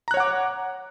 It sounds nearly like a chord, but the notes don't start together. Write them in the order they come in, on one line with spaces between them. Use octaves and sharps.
A#5 F#6 C#5 F#5 D6